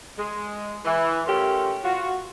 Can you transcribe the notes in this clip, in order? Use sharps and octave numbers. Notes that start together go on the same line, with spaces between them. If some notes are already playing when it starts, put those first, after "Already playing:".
G#3
E3
A3 C#4 F4 G4 A#4
F4 F#4